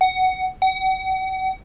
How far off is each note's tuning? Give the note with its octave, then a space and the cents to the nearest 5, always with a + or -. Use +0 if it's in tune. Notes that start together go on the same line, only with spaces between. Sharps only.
F#5 +15
F#5 +40